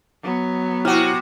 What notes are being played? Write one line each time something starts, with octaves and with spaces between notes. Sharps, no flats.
F#3 B3
C3 E4 F#4 F6